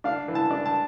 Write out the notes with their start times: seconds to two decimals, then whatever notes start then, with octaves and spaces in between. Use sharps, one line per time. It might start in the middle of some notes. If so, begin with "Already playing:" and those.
0.04 D4 F5
0.28 E3
0.35 A5
0.51 D4
0.66 A5